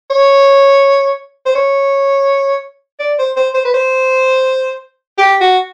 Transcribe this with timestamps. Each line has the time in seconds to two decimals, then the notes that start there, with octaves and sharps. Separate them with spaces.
0.10 C#5
1.46 C5
1.55 C#5
3.00 D5
3.19 C5
3.36 C5
3.54 C5
3.65 B4
3.74 C5
5.18 G4
5.41 F#4